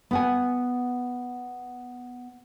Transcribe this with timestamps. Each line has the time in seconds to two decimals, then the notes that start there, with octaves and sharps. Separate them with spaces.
0.11 B3 F#5 G#5